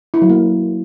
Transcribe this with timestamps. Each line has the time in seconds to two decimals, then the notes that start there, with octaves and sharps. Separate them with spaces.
0.14 E4
0.22 F#3
0.29 A#3